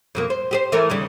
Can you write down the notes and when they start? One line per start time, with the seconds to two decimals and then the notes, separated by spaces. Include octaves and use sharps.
0.15 F2 B2 A#3
0.30 C5
0.51 G4 G#4 C5
0.72 E3 A3 A#4
0.90 D#2 C#3 G3